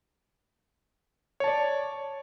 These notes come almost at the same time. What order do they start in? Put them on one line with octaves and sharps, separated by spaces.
C#5 A5 D5